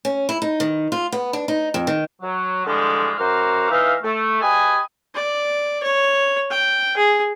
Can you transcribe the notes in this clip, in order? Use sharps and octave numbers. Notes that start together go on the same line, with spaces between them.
C#4
E4
D#4
D#3
F4
B3
D4
D#4
F2
D#3
F#3
D3 E3 F3 G3 G#3
F#2 F#4 C5 A#5 D6 F6
E3 D#4 E5 F5
A3
G4 B4 D#5 G#5
D5
C#5
G5
G#4